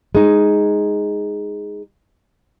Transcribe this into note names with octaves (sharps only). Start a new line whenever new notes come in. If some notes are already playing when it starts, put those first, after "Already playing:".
G#3 D#4